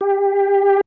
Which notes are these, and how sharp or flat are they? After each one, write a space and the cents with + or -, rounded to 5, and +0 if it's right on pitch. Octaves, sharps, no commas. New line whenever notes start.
G4 +20